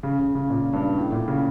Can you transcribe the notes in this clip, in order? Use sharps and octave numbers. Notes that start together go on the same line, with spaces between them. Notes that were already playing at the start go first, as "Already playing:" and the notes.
C#3
C#3
C#3
A#2
G2
A2
A#2
C#3